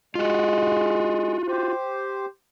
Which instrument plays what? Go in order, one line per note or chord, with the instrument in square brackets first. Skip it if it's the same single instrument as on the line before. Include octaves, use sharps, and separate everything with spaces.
[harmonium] G#3 [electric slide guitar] F4 F#4
[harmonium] G4 C5